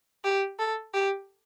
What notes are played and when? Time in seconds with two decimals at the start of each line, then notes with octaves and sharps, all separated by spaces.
0.24 G4
0.59 A4
0.94 G4